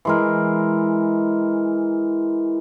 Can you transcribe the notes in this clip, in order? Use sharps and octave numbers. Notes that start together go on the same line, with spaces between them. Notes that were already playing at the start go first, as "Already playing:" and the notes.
E3 G#3 A#4